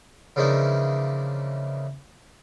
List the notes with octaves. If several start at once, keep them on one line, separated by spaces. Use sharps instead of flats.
C#3 E3 F3 A#3 D4 D#4